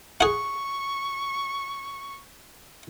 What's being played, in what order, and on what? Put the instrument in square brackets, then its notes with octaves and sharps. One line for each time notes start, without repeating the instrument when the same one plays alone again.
[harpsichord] G#4 F#5 [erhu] C#6